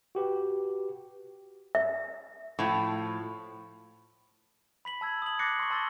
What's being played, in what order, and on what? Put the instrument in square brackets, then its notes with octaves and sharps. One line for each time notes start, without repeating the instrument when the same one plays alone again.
[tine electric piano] F#4 G4 B4
[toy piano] E5
[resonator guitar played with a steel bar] A2 F3
[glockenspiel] B5 B6 F#7
A5 E6 G#6
D#6 F#7
D6 F#6 A6 A#6 C7 C#7
C6 C#6
A5 C6 E6 A6 A#6 G7